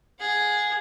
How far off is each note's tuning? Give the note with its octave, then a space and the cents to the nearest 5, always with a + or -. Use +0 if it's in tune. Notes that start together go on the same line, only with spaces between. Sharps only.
G#4 +0 F#5 -30